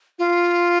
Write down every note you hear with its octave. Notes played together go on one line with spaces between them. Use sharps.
F4